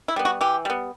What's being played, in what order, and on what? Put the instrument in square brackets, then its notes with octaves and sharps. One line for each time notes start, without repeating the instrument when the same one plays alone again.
[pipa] E4
G3 B3
F#4
E3 G4
G3 B3